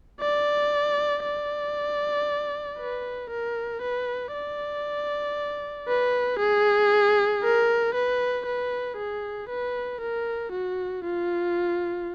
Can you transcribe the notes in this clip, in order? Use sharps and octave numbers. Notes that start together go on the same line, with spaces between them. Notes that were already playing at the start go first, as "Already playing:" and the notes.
D5
D5
B4
A#4
B4
D5
B4
G#4
A#4
B4
B4
G#4
B4
A#4
F#4
F4